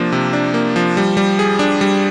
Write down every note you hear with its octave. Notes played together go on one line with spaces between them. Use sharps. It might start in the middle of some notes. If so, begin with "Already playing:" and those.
Already playing: C3 F3 A#3 D4
C3
D4
A#3
F3
G3
G3
G#4
D4
G3